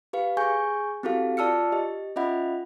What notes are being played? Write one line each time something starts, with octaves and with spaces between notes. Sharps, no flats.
G4 B4 F5
G#4 G#5 C#6 G6
C4 E4 F#4 G4 A4 F5
F4 D5 A5 E6 F6 C#7
G4 D#5
C#4 F4 D#5 E5 F#5 B5